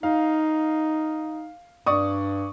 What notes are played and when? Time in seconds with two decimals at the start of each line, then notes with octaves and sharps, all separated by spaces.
0.03 D#4 F5
1.86 G2 D5 C#6 D#6